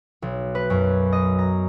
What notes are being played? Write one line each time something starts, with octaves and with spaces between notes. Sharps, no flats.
B1
B4
F#2
D#5
A#5